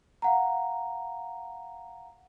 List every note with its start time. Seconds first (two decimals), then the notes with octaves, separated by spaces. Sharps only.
0.22 F5 F#5 A#5